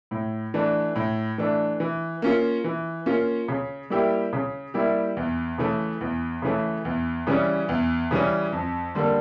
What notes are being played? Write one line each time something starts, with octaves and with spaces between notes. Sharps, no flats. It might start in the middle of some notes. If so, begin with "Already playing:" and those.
A2
E3 A3 D4
A2
E3 A3 D4
E3
A#3 C#4 F4
E3
A#3 C#4 F4
C#3
G3 A#3 E4 G4
C#3
G3 A#3 E4 G4
E2
C#3 E3 A3
E2
C#3 E3 A3
E2
C#3 E3 G3 C#4
E2
C#3 E3 G3 C#4
F2
D3 G3 A#3